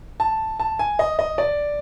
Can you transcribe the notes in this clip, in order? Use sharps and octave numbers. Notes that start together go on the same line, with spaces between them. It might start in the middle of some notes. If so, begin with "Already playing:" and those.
A5
A5
G#5
D#5
D#5
D5